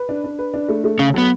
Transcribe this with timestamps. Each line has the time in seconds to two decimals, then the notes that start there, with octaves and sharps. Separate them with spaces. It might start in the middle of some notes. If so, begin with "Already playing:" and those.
Already playing: B4
0.09 D4
0.24 D4
0.39 B4
0.54 D4
0.69 A3
0.84 A3
0.99 C#3 C#4 A4
1.14 F#3 B3